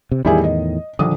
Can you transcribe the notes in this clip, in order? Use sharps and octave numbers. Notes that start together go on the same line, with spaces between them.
C3
E2 A2 D#3 G3 E4 G#4
D#5
D#1 A#1 D3 D#6